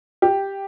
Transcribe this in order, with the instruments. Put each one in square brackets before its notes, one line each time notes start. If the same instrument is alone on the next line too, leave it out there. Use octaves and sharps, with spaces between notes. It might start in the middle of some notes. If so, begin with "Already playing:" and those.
[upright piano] G4